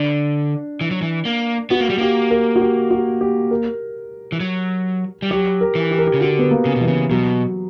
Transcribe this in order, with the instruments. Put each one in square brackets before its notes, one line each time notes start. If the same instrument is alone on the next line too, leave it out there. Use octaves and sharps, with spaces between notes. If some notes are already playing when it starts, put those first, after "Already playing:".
Already playing: [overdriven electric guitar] D3 [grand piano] D4
[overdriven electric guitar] E3
F#3
E3
A#3
[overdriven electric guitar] B3 [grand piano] F#4
[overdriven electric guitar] A#3
G3
[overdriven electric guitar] A#3 [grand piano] G4
[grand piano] A#4
F#4
G4
F#4
G4
A#4
[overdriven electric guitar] E3
F#3
G3
[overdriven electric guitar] F#3 [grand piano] G4
[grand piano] A#4
[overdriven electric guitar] E3
[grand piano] G4
A#4
G4
[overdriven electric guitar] C#3
[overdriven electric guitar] D3 [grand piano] F#4
[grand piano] B3
A#3
[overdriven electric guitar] C#3
[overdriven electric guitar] B2 [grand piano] E3
[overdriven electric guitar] C#3
[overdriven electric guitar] B2 [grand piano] F#3